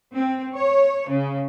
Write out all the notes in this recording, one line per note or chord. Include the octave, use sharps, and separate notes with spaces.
C4
C#5
C#3